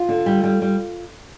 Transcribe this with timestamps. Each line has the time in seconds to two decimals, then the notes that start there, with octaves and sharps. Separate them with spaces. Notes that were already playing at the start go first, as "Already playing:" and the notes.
Already playing: F4
0.09 D3
0.26 G3
0.44 G3
0.62 G3